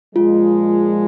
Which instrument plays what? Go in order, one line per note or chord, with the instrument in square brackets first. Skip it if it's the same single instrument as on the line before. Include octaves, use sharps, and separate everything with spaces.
[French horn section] A#2 F3 G#3 [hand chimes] F4